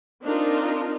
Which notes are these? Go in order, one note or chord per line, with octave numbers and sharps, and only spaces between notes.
C4 D4 D#4 F4 A#4